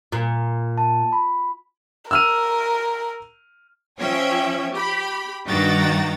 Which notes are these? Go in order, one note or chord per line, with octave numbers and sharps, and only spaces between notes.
A#2
A5
B5
A#4 E6 F6 D#7
F3 C#4 C#5 E5 G5 G#6
G4 B5
G2 D#3 F#4 G5 A#5 A6